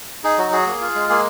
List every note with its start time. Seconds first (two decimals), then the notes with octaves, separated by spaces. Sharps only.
0.24 D#4 G#4
0.38 F#3 F#4
0.52 F#4 G#4
0.67 A#3
0.81 F4
0.95 G#3
1.09 A#3 G#4